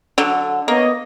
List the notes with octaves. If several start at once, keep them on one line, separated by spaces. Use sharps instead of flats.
D3 F#3
A#3 B3 C#5 D#5